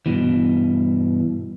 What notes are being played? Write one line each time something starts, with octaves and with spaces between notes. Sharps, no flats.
G2 B2 E3